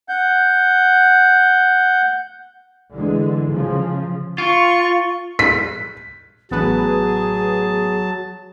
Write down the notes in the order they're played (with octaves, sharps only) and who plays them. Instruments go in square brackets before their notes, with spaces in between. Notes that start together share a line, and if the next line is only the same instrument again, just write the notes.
[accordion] F#5 G6
[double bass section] D3 E3 G#3
C#3 F3
[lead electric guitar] F4 [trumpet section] C#6
[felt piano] B6
[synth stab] A1 B3 B4 [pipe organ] F#3 A5 [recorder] G#4